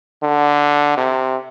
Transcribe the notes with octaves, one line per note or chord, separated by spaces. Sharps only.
D3
C3